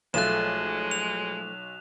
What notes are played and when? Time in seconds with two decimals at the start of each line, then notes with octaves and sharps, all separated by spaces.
0.14 B1 F3 G#3 A3 F#6 E7
0.91 F7